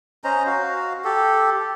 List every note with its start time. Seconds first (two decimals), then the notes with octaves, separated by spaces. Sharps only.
0.24 C#4 C5 D#5 A#5
0.46 F#4 F5
1.04 G4 A4